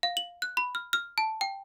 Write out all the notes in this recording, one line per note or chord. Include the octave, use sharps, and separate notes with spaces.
F5
F#7
F#6
B5
F6
F6
A5
G5